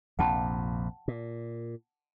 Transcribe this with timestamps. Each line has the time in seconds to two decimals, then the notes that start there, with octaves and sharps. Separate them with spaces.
0.19 A#1 F2 C3 F#5 G5 A5
1.08 A#2